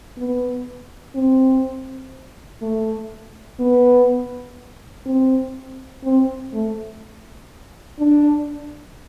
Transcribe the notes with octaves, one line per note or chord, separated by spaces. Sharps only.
B3
C4
A3
B3
C4
C4
A3
D4